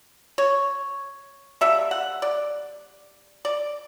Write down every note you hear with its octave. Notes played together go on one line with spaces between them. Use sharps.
C#5
D3 G3 A#3 E5
F#5
D5
D5